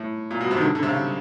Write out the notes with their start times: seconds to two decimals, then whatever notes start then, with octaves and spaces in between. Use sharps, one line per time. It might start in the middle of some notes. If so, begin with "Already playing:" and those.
Already playing: A2
0.31 A#2
0.41 B2
0.51 C3
0.57 D#3
0.61 D3
0.75 D3
0.83 C3
0.89 C#3